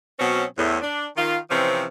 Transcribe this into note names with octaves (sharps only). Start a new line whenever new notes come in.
B2 F#3 C4 C#4
E2 A2
D4
D#3 F4
C3 E3 F3 C4 C#4